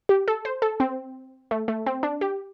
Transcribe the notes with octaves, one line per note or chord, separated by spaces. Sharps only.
G4
A4
C5
A4
C4
A3
A3
C4
D4
G4